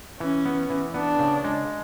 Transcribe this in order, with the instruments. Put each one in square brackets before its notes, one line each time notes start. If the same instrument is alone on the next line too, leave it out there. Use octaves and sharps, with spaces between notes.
[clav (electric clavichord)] E3 [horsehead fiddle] C#4
[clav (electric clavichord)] B3
E3
[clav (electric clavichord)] B3 [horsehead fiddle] D4
[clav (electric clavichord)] C#3
G#3